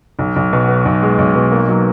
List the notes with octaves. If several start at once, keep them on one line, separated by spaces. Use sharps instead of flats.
B1
B1
B2
B3
B1
G#3
B1
B2
A#3
F#3